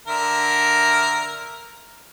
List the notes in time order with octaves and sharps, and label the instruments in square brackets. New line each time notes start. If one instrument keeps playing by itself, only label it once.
[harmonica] D3 A#4 E5